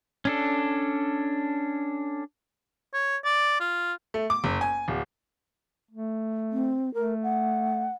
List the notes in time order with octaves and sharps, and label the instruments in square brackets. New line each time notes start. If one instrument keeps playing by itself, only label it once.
[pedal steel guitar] C#4 D4 A4
[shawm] C#5
D5
F4
[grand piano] A3
D6
F#1
G#5
D1
[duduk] A3
[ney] C4
[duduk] A3 [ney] A#4
[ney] F#5